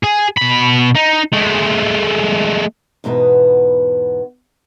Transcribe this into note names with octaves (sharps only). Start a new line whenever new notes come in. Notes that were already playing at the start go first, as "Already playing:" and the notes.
G#4
B2 B5
D#4
G#3 A3
E2 G#2 B2 B3